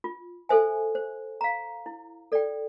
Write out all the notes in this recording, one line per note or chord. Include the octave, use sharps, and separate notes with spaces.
F4
A4 C5 E5 G#5
C5
F5 A#5
E4
A4 D5 G5